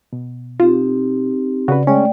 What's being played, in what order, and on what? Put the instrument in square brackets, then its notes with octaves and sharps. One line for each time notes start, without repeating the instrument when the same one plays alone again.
[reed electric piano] B2
[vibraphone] C4 D#4 G4 [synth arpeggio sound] F4
[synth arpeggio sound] C#3 [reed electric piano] F#4 B4 [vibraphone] D5
[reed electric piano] G#3 C#4 [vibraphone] A3 D5 G5